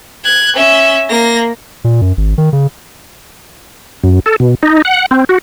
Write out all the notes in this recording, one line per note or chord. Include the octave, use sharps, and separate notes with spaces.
F#6 G#6
C#4 E5
A#3 A#6
A#2
F#2
G#1
D#3
C#3
F#2
A4
B2
D#4
F#5
C4
F#4